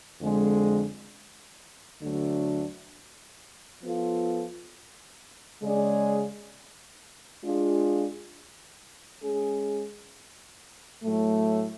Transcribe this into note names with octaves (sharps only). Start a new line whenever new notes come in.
F2 D3 G#3
D2 D3 F#3 A3 D4
F3 B3 F4 A4
C#3 G#3 C#4 G#4 D5
G#3 D4 F4 G#4
G#3 C#4 G#4
A2 F#3 A3